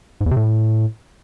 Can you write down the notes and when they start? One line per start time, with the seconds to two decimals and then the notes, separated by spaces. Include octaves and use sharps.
0.21 G#2
0.26 E2
0.31 C3
0.36 A2